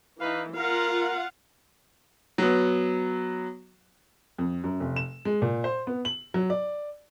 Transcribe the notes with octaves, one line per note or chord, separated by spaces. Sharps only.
E3 D#4 B4 F5
F4 A#4 F5 F#5
F#3 B3
F2
F#2
F1
E7
G#3
A#2
C5
B3
F#7
F#3
D5